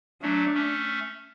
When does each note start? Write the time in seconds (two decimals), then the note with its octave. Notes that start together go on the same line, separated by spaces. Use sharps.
0.22 F#3 A3 D4
0.54 A3 C#4